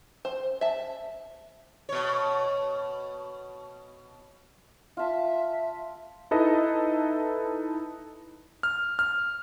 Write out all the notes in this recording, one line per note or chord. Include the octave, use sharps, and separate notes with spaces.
C5
E5 A5
B2 C#5
F4 E5 A5
D#4 E4 A4 B4 D#5
F6
F6